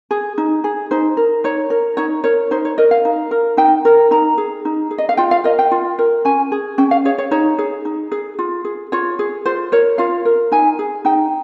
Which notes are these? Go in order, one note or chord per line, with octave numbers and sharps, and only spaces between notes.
G#4
D#4
G#4
D#4 C5
A#4
D#4 C#5
A#4
D#4 C#5
A#4 C#5
D#4 C5
C#5
A#4 D#5
F5
D#4
A#4
D#4 G5
A#4
D#4 A#5
G#4
D#4
G#4
D#5
F5
F4 G5
F5
A#4 D#5
G5
F4
A#4
C#4 G#5
G#4
C#4 G5
F5
G#4 C#5
C#5
D#4 C#5
G#4
D#4
G#4
F4
G#4
F4 C#5
G#4
F4 C5
A#4 C#5
F4 F5
A#4
D#4 G#5
G#4
D#4 G5